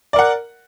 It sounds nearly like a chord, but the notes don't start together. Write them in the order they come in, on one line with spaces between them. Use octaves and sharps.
D5 A#4 F#5